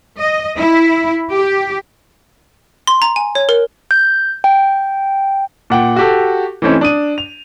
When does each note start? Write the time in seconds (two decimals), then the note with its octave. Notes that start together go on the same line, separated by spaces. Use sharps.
0.19 D#5
0.58 E4
1.31 G4
2.87 C6
3.02 A#5
3.16 G#5
3.35 C#5
3.49 A#4
3.91 G6
4.44 G5
5.70 A#2 F#5 G5
5.96 F#4 G4 A4
6.62 E3 A3 C4 C#4 D#4
6.81 D4 D#6 D#7
7.18 F7